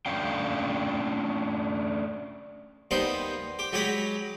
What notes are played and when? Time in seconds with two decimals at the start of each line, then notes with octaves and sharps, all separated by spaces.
0.06 A3 C#4 D4 F5 G5
2.91 D#2 G3 B3 D#4 C5
3.59 G4
3.73 F#3 G#3 G4 C#5 A#5 B5